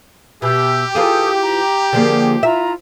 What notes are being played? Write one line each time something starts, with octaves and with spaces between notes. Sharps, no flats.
B2 G4 E5 E6 G6
E3 F4 G#4 A4 D#6 G6
A#5
D3 F3 A#3 G#4
E4 F4 E5 A#5